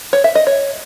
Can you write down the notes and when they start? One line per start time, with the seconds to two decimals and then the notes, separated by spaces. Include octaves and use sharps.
0.13 C#5
0.24 E5
0.35 D#5
0.47 C#5